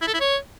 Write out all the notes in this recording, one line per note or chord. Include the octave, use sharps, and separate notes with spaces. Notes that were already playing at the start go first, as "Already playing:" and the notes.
E4
A4
E4
C#5